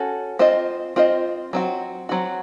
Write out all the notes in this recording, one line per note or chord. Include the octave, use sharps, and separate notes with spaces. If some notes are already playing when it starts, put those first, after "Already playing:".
Already playing: C#4 F#4 A4
C4 F4 C5 D#5
C4 F4 C5 D#5
F#3 C4 F#4
F#3 C4 F#4